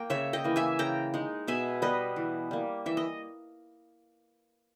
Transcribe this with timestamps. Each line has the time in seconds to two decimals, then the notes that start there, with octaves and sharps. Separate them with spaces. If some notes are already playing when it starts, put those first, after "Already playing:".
Already playing: A#3 G5 A#5
0.10 C#3 C#5 E5
0.33 D#5 G5
0.44 E3 A#3
0.56 E5 G#5
0.79 C#3 G5 A#5
1.14 G#3 D#4
1.48 B2 E5 G#5
1.82 G3 B3 B4 D#5
2.16 E3
2.51 G3 A#3
2.86 E3 E5
2.97 D#5